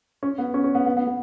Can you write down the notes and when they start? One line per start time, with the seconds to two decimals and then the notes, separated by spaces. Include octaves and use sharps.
0.23 C#4
0.38 B3
0.54 C#4
0.64 C#4
0.75 B3
0.86 B3
0.97 B3
1.07 B3